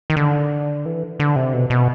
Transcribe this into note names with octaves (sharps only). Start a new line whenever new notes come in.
D#3
D3
E3
D3
C3
B2
B2